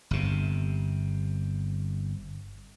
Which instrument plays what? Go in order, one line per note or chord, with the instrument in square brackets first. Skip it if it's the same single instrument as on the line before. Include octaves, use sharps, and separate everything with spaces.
[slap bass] G1 C3